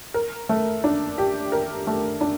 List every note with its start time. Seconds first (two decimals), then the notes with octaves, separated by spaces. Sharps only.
0.14 A#4
0.49 A3
0.84 D4
1.18 G4
1.52 A#4
1.87 A3
2.21 D4